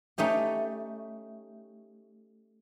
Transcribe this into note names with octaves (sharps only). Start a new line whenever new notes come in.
A3 C#4 D#4 G4